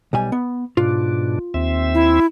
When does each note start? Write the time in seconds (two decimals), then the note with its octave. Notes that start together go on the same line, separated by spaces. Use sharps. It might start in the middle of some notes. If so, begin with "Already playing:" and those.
0.13 B1 G3 G#5
0.32 B3
0.77 G#2 B2 D4 F4
1.54 D#2 C4 E5
1.94 E4